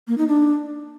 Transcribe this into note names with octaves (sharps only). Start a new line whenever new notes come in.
A#3
D#4
D4